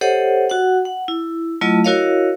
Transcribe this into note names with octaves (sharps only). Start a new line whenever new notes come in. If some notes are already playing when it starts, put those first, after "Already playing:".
G4 A4 C5 C#5 D#5 F#5
F#4 F#5
F#5
E4
F#3 A3 E4 F4 D#5 A5
E4 F#4 A#4 C#5 D#5 F5